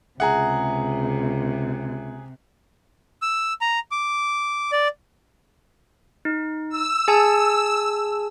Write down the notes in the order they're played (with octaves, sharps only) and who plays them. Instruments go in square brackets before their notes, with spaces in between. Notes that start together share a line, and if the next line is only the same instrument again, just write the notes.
[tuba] C#2 [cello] C3 [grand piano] G#4 F#5 [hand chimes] E5 A#5
[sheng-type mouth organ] E6
A#5
D6
D5
[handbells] D#4
[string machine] E6
[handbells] G#4 G#5 A5